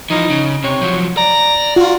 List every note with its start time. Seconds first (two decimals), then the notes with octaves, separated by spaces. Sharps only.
0.10 E3 F3 D#4
0.30 C#3
0.64 C3 C#5
0.81 F3 F#3
1.17 D5 A#5
1.76 F4 F#4